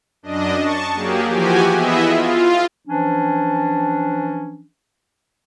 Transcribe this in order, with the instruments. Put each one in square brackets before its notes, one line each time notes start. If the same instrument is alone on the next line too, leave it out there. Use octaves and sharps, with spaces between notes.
[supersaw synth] F#2 D4 D#5
A5 C#6
F#3 A#3 G4 G#4
E3 F3 F#4 G4 G#5
B3 E4 G#4 D#5 E5
F4
[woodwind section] E3 F3 C#4 D4